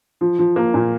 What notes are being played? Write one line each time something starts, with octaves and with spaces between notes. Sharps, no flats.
F3
F3
A#3
A#2